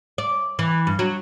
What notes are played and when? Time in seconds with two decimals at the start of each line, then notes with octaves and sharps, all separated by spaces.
0.18 D5
0.59 E3
0.87 G2
0.99 F#3